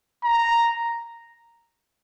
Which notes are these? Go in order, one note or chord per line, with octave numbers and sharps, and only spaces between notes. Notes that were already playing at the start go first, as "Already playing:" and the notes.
A#5